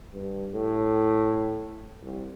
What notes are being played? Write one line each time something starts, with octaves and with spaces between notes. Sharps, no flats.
G2
A2
C2